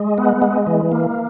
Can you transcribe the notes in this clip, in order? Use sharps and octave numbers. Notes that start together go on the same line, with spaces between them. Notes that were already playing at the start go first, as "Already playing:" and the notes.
Already playing: G#3
B3
G#3
E3
A#3